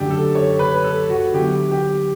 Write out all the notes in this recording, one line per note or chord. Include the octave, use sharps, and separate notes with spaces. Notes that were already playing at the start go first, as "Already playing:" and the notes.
Already playing: F#2 D3 A3 D4 F#4 G4
A4
C#5
B4
A4
F#4
D3 F#3 B3 E4 G4
G4